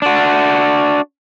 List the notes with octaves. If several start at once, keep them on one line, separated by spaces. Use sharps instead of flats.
D4 F#4